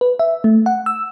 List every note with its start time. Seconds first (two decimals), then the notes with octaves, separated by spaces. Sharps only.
0.01 B4
0.19 E5
0.44 A3
0.66 F#5
0.86 E6